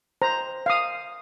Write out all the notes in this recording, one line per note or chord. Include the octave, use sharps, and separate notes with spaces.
C5 A#5
F5 D#6